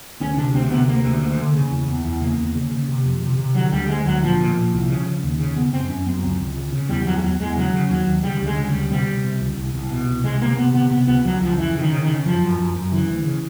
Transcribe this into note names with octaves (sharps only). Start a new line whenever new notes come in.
D2 C#4
C3 D4
D2 C4
C3 B3
D2 A#3
D2
D2
D3
C#3
E2
E2
E2
C#3 A#3
E2
C#3
C#3
C3
F2
C3
C3
D3 F#3
D2 G3
D2 G#3
D2 F#3
A#2 F3
A#2
A#2
C2
C#3
C#3
D#2
C#3
C#3 B3
F#2 C4
F#2 C#4
F#2 C4
C#2 C4
C#2
C#3
C#3
E2 G3
E2 F#3
G3
E2 F#3
E2 G#3
C#3 F#3
C#3
D#2 F#3
D#2
C#3 G3
D2
G#3
C#3
G3
D2
C3 G3
C3
C3
C#2
C2
C2
B2
C2
C3 G#3
C3 A#3
C3 B3
C3 B3
C3 B3
C#2 B3
C#2 F#3
C#2 F3
F2 E3
C#3
D#3
C#3
D#3
C#3
F#2 F3
F#2
F#2
F#2
C#3 E3
D2
C#3